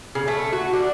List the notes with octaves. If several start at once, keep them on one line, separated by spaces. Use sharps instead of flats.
C#3
A3
F#4
D4